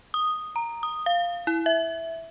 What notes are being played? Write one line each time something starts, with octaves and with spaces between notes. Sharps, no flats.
D#6
A#5
D#6
F5
E4
E5